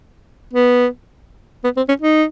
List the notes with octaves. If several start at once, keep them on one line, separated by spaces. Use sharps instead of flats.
B3
B3
C4
C#4
D#4